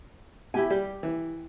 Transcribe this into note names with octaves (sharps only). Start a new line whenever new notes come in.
B2 E4 G4 G#5
G3 G4
E3